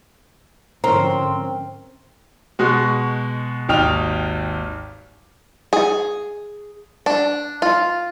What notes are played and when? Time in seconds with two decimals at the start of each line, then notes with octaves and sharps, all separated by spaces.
0.84 G#2 D3 F3 C4 C#4 A#4 A#5
2.59 B2 G#3 F#4
3.69 G#1 D#2 D#4 G5 F6 F7
5.73 G#4
7.06 D4
7.62 F4